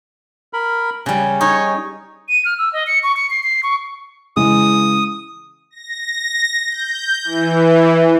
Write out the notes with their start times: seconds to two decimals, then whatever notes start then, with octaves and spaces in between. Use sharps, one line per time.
0.53 A#4 B5
1.06 C#3 G3 C#4
1.41 D#4 C#5
2.29 D#7
2.45 F6
2.58 E6
2.73 D#5
2.87 C#7
3.03 C#6
3.17 C#7
3.30 C7
3.43 C7
3.63 C#6
4.37 C#3 E3 G#3 D#6
5.71 A#6
6.69 G6
7.24 E3